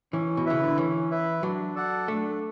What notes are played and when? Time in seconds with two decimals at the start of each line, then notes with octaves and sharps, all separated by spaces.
0.12 E3 C#4
0.37 B2
0.46 C#3 E4 B4 E5
0.64 D3
0.78 E3 C#4
1.10 E4 B4 E5
1.42 F#3 D4
1.76 A4 D5 F#5
2.07 A3 D4